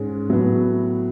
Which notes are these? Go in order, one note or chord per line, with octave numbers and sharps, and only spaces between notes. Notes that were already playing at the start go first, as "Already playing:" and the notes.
Already playing: G#2 G#3 C#4
A2 F#3 B3